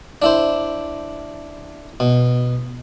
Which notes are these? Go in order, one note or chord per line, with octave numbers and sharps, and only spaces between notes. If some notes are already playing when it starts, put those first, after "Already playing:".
D4 E4 C5
B2